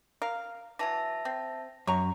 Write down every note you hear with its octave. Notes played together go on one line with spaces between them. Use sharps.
A#4 F5
E3 F#3 E5 A5 A#6
C4
F#2 A#5 C#6